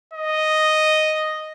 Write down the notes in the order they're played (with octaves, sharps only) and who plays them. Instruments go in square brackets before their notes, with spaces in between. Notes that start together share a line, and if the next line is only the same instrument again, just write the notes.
[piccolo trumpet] D#5